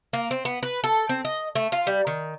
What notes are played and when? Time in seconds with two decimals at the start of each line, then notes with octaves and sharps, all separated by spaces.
0.13 A#3
0.31 C4
0.45 B3
0.63 B4
0.84 A4
1.09 C4
1.25 D#5
1.55 A3
1.72 F4
1.87 G3
2.07 D#3